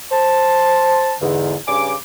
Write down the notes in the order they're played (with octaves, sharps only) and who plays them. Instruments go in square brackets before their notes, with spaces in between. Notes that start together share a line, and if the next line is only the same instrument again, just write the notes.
[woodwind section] C5 A5
E2 G#2 D3
G2 C#3 G#5 D6